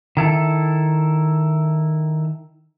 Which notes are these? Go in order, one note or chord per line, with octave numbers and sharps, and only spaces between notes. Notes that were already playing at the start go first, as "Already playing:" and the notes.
D#3 E4 A4